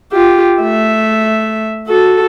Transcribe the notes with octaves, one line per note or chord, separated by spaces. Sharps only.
F4 G4
A3 E5
F#4 A4